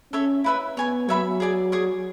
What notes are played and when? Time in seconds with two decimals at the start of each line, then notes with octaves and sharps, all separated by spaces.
0.13 C#4 A4 C#5 E5
0.44 E4 B4 E5 B5
0.77 B3 C#5 G#5 C#6
1.09 F#3 C#5 E5 B5
1.40 G#4 D5 G#5
1.72 G#4 D5 G#5 C#6